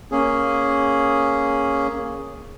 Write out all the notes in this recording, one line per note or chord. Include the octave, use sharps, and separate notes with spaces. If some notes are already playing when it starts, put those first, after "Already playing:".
A#3 C#4 G#4